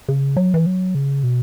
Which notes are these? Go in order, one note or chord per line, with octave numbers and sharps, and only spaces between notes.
C#3
F#3
E3
F#3
C#3
B2